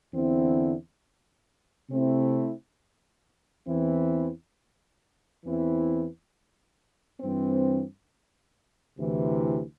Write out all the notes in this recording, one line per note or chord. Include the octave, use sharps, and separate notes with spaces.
E2 D3 C4 E4
C3 A3 C4 E4
E2 E3 C4 E4
E2 E3 C4 E4
G2 E3 C4
D2 C3 E3